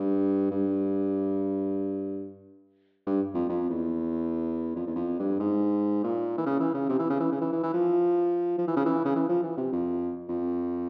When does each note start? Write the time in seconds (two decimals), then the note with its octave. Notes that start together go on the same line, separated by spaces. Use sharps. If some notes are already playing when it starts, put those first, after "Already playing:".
Already playing: G2
0.51 G2
3.06 G2
3.34 F2
3.49 F2
3.70 E2
4.76 F2
4.87 E2
4.95 F2
5.19 G2
5.40 G#2
6.03 A#2
6.38 E3
6.46 C#3
6.60 E3
6.74 C#3
6.89 C3
6.99 E3
7.10 C#3
7.20 E3
7.32 C#3
7.41 E3
7.52 E3
7.63 E3
7.73 F3
8.58 F3
8.68 E3
8.76 C#3
8.86 E3
9.05 C#3
9.15 E3
9.29 F3
9.43 E3
9.57 C3
9.72 F2
10.29 F2